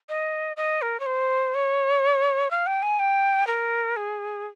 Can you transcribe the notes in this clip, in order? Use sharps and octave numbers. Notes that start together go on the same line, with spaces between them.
D#5
D#5
A#4
C#5
C5
C#5
F5
G5
G#5
G5
A#4
G#4